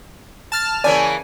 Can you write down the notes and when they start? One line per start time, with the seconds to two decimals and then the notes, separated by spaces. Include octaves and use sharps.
0.52 A5 F6 A6
0.84 C#3 E3 A#3 D5 G#5 A5